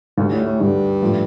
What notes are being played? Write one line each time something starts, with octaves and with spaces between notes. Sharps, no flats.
D2 G2 D3 G3
A2
A2
D2 G2 D3 G3
A2 F3 A3